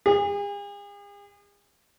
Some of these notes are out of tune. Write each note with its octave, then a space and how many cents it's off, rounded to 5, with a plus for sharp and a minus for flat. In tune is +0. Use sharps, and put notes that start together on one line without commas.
G#4 -45